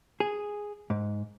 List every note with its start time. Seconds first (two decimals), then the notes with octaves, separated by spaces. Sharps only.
0.20 G#4
0.90 G#2